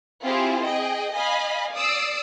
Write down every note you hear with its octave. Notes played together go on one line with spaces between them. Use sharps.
C4 E4 F4 G4 G#4
G#4 D#5 G5
D#5 F5 G#5 B5
D5 D#6 E6 C7 D7